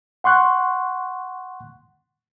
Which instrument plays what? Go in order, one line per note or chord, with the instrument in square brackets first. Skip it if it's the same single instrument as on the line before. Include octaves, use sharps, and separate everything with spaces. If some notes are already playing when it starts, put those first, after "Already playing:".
[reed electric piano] F#5 C6 C#6 F#6